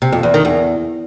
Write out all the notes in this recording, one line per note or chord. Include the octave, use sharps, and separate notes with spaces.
C3
F2
E2
D#3
E2